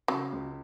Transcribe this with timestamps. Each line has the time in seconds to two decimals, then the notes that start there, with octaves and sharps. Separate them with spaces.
0.08 C#3 F#3
0.33 C#2